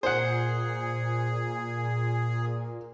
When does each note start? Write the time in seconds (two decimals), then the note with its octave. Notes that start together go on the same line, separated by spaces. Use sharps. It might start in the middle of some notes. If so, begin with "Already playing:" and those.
0.03 A#2 G#4 C5 F#5